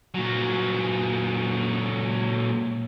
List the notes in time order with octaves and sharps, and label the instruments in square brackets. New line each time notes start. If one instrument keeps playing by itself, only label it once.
[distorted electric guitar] A#2 F#3